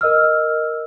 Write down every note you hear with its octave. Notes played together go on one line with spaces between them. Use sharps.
A#4 D#5 E6 F6